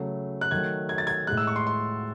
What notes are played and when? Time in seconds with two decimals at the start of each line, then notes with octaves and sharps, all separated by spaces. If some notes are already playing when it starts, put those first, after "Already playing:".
Already playing: C#3 F#3 A3
0.41 F#6
0.51 D#3 F#3 A3 G#6
0.89 G#6
0.98 A6
1.07 G#6
1.27 A2 G#3 F#6
1.37 E6
1.47 C#6
1.56 C6
1.67 C6